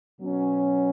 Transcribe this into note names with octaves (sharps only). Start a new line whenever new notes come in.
B2 F#3 C#4